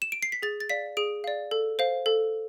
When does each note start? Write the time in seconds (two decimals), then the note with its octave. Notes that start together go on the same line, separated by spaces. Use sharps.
0.02 E7
0.12 D7
0.23 C7
0.32 B6
0.42 G#4 A6
0.60 A6
0.69 D5 F5 B6
0.97 G#4 D7
1.24 D5 F5
1.51 A4
1.79 C5 F5
2.06 A4